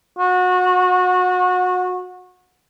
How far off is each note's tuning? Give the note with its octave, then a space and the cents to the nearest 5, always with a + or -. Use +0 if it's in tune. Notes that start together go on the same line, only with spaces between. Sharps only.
F#4 -25